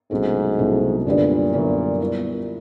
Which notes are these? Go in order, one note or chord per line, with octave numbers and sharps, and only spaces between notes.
C2 G#2 B2 F#3 A3 C#4
C2 B2 F#3 A3 C#4
F#2 A#2 D3 G3 B3 D4
F#2 D3 G3 B3 D4
G3 B3 E4